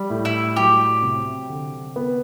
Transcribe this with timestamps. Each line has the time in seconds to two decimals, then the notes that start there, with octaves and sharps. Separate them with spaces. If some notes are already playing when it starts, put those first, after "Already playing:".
Already playing: G3
0.10 A2
0.25 E4
0.56 F#3 G4
1.02 C3
1.50 D3
1.96 B3